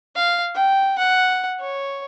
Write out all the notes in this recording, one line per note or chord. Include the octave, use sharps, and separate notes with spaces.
F5
G5
F#5
C#5